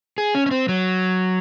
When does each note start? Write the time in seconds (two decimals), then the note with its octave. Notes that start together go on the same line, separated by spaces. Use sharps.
0.18 G#4
0.35 C#4
0.46 C#4
0.51 C4
0.69 F#3